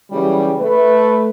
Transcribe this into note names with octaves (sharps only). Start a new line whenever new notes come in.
C#3 E3 F#3 G3
A3 B4